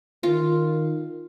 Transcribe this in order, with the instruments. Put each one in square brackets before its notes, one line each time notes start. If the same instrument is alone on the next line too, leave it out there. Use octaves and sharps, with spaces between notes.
[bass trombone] D#3 [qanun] F4